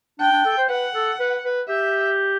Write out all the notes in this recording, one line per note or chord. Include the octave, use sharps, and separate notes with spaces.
D4 G5
D4
A4
C5
B4 F#5
A4
B4
B4
G4 E5